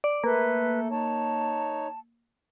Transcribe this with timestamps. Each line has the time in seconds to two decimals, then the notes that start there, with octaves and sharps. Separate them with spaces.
0.04 D5
0.24 A3 A#3 A4 B4
0.90 D#4 C#5 A5